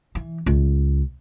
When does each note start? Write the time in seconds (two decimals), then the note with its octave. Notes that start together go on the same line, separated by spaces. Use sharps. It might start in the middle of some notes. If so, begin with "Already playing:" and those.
0.15 E3
0.46 C#2